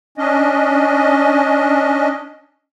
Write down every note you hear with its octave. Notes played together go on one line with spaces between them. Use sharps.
C#4 D4 D#5